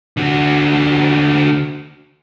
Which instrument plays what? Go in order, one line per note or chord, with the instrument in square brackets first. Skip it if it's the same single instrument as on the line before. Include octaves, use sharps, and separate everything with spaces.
[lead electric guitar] D3 F#4